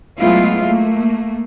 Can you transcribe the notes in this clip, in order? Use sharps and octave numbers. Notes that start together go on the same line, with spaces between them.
F#3 G#3 A3 B3 E4 F4
A3 A#3